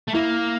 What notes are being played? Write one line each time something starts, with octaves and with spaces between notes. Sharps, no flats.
A3
A#3 E4